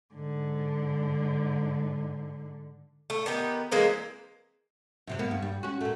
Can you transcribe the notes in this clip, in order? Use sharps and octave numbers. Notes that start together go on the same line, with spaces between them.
G#2 D3
A3
D#3 B3 G4
E3 G#3 A#3 C4
F#2 C3 F#3
A#3 B3
G2
G3
C#4 F#4
A#2 A3